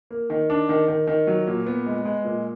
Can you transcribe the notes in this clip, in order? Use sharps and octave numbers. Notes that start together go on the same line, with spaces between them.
A#3
D#3
D4
D#3
D#3
D#3
F#3
A#2
B3
G#3
G#3
A#2